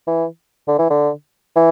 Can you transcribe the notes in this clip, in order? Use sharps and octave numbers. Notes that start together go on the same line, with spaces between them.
E3
D3
E3
D3
E3